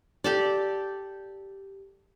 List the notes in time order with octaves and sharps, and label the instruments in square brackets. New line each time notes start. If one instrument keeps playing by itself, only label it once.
[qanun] G4 A4 D5